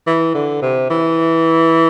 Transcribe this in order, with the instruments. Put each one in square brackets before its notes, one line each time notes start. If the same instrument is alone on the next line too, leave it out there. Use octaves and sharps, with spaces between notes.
[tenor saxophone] E3
D3
C3
E3